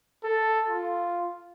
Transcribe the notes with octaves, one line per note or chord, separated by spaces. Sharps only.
A4
F4